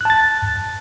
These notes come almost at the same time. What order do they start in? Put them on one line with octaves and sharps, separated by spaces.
F#6 A5 A6